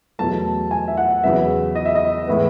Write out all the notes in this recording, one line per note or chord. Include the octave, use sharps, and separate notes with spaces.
E2 B2 F#3 A3 A5
G#5
E5
F#5
E2 C#3 F#3 B3 E5
D#5
E5
D#5
A2 E3 G#3 B3